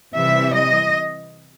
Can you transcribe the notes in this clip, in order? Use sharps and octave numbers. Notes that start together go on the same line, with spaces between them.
C3 E3 G3 E5
D#5